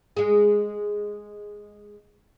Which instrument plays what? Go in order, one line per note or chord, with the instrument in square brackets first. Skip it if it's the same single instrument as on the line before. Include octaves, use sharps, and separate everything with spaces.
[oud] G#3 G#4